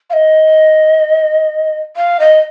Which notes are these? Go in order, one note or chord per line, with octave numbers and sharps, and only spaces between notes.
F5
D#5
F5
D#5